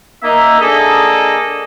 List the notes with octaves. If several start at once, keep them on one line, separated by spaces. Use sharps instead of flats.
A#3 D#4 E5
A#3 D4 G#4 A4 D#5